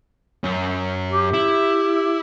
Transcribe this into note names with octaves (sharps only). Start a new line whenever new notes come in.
F#2 C#4
G4
E4